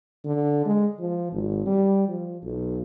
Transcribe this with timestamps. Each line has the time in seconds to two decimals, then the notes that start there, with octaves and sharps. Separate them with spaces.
0.25 D3
0.65 G#3
1.00 F3
1.33 G#1
1.66 G3
2.08 F3
2.43 B1